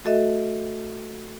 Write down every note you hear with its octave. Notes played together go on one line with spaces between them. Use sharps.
A3 F#4 A4 D#5 E5